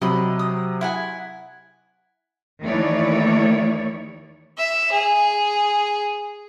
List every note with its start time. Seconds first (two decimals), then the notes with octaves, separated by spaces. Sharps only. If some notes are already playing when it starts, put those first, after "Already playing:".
0.02 C3 F#3 D#5 B5
0.39 D#6
0.81 E4 F#5 G#5
2.62 D#2 D#3 E3 A3 C#5 D5
4.57 E5
4.92 G#4